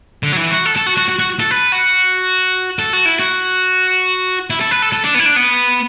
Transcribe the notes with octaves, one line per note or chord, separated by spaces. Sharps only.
D3
F#3
E3
F#4
A4
A4
F#4
F#4
F#4
F#4
A4
B4
F#4
A4
F#4
E4
F#4
E4
A4
B4
A4
A4
D4
B3
E4
D4
B3